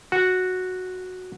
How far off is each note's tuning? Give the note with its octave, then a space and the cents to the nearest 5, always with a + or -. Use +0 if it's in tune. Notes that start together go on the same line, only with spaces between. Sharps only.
F#4 -5